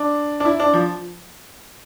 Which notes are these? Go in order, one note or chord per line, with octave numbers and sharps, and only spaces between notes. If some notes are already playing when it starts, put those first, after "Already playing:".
Already playing: D4
D4
E4
D4
F3